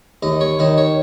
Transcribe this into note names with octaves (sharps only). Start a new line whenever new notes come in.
D#2 D#5
C#5
D#3 D#5
C#5